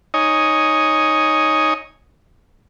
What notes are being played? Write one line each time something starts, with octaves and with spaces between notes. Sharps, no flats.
D#4 C#5 D#5 G#5